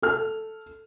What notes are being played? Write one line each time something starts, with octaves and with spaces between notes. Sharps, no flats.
A4 F6